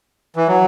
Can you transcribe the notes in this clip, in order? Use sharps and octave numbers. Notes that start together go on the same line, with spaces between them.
E3
F#3